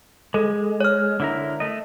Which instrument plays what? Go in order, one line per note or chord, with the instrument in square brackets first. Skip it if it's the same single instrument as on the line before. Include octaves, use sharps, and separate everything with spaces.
[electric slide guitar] G#3 [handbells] A4
[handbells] C#5 F6
[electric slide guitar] D3 E4 A#4
A3 D#5